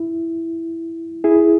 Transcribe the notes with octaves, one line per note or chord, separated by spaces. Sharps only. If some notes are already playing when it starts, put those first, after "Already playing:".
Already playing: E4
E4 G#4